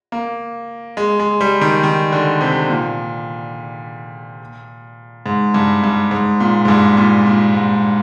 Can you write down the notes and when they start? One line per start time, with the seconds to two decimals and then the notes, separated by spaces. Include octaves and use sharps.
0.12 A#3
0.97 G#3
1.19 G#3
1.41 G3
1.61 D#3
1.83 D#3
2.12 D3
2.41 C3
2.69 A#2
5.26 G#2
5.54 G2
5.84 G2
6.11 G#2
6.40 A#2
6.65 G#2
6.68 G2
6.97 A#2
7.26 A#2
7.54 G#2